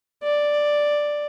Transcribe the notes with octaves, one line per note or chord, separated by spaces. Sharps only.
D5